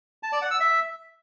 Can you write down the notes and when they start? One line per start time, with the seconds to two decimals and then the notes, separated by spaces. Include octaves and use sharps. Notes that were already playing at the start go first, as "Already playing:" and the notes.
0.23 A5
0.32 D5
0.42 F#5
0.51 E6
0.60 E5